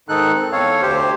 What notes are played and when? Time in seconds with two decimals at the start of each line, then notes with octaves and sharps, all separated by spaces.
0.09 G#2 D#3 D#4 A4 F#6
0.34 C4
0.52 E2 A4 C#5 F5
0.82 D2 G4 C5